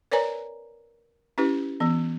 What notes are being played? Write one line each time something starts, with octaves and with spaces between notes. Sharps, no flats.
A#4 B4 C#5 D5 G#5 A#5
C#4 E4 G4 B4
E3 B3